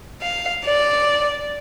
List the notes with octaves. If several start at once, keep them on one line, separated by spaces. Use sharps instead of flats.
F5
D5